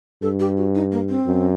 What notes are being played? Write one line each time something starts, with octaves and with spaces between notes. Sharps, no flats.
G2 A4
G4
F#4
D#4
A#3
C4
F#2